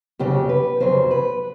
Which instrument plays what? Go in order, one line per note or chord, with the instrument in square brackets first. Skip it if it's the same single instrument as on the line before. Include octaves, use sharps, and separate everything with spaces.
[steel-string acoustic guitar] F2 C#3 F#3 G4
B4
F2 C#3 F#3 C5
B4